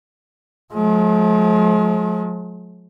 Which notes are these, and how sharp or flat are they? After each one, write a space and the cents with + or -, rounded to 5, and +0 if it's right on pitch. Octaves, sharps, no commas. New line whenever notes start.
F3 +40 G#3 +45